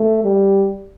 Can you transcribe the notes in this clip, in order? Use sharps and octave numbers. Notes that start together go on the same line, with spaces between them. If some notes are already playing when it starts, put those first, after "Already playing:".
Already playing: A3
G3